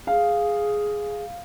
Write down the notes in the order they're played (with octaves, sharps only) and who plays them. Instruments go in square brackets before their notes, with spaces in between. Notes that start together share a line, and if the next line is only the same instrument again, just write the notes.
[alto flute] G#4 [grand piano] F5